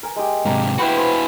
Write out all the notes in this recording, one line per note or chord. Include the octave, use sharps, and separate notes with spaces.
A#4 G#5
G#3 G4
G#2 C3 A#3 D4
E4 F#4 B4 C5 G5
C5 G#5